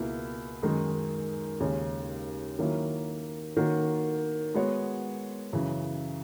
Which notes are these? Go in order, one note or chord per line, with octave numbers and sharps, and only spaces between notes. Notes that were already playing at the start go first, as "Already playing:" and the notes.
Already playing: C#2 B2 A#3 E4
F#2 D#3 G#3 D#4
D#2 C#3 G#3 C#4 G#4
D#3 F#3 A#3 C#4 E4
D#3 A#3 C#4 F#4
G#3 B3 F#4 C#5
F#2 C#3 E3